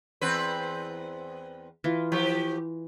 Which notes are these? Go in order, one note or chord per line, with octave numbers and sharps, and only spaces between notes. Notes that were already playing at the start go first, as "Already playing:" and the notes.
E2 C4 B4
E3 F4
F3 G4